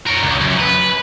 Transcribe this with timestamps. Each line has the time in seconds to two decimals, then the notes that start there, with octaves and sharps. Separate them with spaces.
0.07 A#4 C#5
0.23 C#2
0.41 F#2
0.60 B4